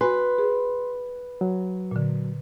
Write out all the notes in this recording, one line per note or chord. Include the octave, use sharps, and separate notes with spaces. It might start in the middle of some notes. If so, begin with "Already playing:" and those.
F#4 B4 G#5 C6
G#4
F#3
A#2 D3